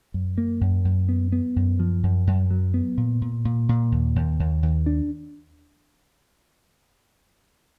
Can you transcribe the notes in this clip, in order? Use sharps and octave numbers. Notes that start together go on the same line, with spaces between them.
F#2
A#3
F#2
F#2
B3
B3
F#2
F3
F#2
F#2
F#3
B3
A#2
A#2
A#2
A#2
D#2
D#2
D#2
D#2
D4